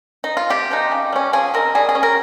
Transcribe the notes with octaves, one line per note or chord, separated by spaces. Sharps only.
D#4
F4
C3 G4
F3 G#3 D#4
C#3
G3 C#4
F3 G#4
C4 D#4 A#4
G3 G#4
G#4
C#4
A#4